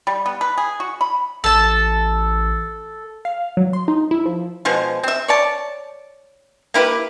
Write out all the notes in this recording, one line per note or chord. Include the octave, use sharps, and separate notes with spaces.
G3
B3
B4
G#4
F#4
B5
A1 A4 A5
F5
F#3
C6
D#4
E4
F3
B2 F3 G#3
C4 E5
C#5 D5 A5
A#3 E4 G4 B4